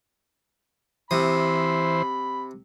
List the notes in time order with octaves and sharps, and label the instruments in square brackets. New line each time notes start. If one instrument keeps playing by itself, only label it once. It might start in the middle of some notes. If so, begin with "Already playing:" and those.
[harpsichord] C3 D#6 [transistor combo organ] E3 C5 [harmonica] B5